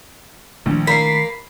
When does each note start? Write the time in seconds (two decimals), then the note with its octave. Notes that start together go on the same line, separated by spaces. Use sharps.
0.66 A#1 D#3 E3 A3
0.87 A#3 B5 B6 C7